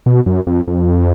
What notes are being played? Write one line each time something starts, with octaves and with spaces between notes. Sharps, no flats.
B2
F#2
F2
F2